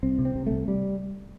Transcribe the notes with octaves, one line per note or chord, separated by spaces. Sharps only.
C2 C4
C3
C4
C3
C2 A3
G3